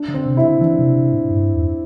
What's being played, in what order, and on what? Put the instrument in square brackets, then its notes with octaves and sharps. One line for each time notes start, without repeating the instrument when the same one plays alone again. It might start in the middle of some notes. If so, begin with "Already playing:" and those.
Already playing: [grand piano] D4
[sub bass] D3
[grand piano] C4
[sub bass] C3
[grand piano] E4
[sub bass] D3
[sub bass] E3 [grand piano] D4
[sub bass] C3
C3
A2
G2
E2